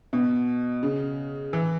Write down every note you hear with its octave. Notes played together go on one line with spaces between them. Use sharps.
B2
C#3
E3